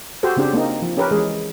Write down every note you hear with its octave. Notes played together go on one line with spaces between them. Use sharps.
F#4 G4 A4 C5
C#3 C4 D4 G4 C5
A#3 C4 D#4
F3
C#4 G4 A#4 B4
E3 G#3 G#4